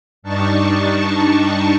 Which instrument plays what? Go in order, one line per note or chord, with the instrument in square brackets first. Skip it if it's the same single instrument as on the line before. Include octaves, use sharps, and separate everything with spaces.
[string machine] G2 G3 D4 D#4 A5 C#6